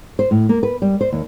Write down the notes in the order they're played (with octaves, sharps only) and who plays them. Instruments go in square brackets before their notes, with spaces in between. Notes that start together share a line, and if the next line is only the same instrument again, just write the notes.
[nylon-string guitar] C5
A2
A#3
B4
G3
C5
D#2